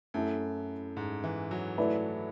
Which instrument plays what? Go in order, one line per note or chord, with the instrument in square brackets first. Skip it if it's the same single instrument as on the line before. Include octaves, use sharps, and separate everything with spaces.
[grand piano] F#2 [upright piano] A3 E4 A4
[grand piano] G#2
E3
F#3
[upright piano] A3 E4 B4 D5